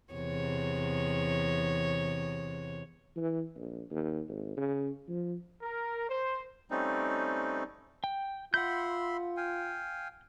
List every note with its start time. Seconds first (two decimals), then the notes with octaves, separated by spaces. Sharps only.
0.13 E2 C3 C#5
3.16 E3
3.56 A#1
3.90 D#2
4.28 G#1
4.57 C#3
5.08 F3
5.62 A#4
6.09 C5
6.71 G3 A3 C4 C#4 D#4
8.04 G5
8.54 F4 E5 F#5 B5 C6 G6
9.37 F5 G5 G#5